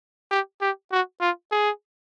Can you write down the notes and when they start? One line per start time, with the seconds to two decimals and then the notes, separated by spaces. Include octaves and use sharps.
0.31 G4
0.61 G4
0.92 F#4
1.21 F4
1.52 G#4